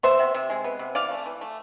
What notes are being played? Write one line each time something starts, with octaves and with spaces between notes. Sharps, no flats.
B3 C5 E5
C3
C3
G#3
B3
C3
E3 D5 F5
A3
E3
A3